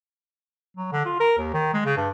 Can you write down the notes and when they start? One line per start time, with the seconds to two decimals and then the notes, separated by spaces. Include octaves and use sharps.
0.77 F#3
0.92 D3
1.05 F4
1.20 A#4
1.38 D#2
1.53 D#3
1.74 G#3
1.85 C#3
1.97 G2